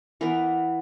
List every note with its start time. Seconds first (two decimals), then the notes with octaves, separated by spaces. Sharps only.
0.21 E3 B3 A#4